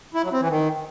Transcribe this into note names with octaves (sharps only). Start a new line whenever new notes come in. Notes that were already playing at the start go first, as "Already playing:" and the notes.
E4
F#3
C4
E3
D#3